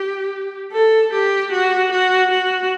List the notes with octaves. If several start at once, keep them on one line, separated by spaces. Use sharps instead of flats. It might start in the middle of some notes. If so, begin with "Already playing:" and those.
Already playing: G4
A4
G4
F#4
F#4
F#4